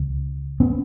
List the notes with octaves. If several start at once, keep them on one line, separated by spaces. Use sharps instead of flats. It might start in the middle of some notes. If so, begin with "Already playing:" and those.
Already playing: C#2 C#3
B3 C#4